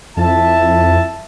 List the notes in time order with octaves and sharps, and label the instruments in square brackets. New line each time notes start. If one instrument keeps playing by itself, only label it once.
[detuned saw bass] F2 [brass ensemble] E4 E5 A5